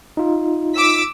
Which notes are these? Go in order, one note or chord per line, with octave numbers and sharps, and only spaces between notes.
D#4 F4
D6 E6 B6